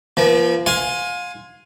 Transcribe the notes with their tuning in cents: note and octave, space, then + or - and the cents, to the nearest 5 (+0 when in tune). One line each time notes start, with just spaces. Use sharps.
F3 -25 A#3 +45
F5 +30 G#5 +0 C6 +0